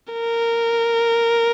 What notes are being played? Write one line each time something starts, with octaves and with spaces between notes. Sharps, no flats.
A#4